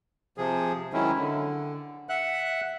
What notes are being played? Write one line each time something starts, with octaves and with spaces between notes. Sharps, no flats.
C3 F3 G#4
D#3 F#3 G#3 C#4 E4
D3
E5 F#5 F#6